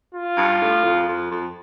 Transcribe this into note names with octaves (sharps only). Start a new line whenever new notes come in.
F4
G2
A2
F2
F2
F2